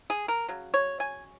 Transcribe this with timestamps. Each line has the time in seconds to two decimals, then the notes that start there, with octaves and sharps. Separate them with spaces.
0.10 G#4
0.28 A#4
0.49 C#3 F#3
0.74 C#5
1.00 G#5